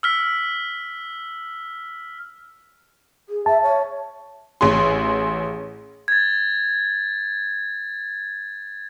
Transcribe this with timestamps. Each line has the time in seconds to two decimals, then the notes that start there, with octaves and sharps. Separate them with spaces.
0.03 E6 F6 B6
3.29 G#4
3.46 E5 A5
3.62 C#5
4.61 A1 G#4 C6
6.08 G#6 A6